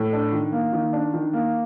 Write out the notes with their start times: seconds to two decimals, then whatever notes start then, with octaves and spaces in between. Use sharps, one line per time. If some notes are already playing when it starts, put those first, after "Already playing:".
Already playing: A2
0.13 D4
0.32 D#3
0.52 A#3
0.73 D#3
0.93 D4
1.13 D#3
1.33 A#3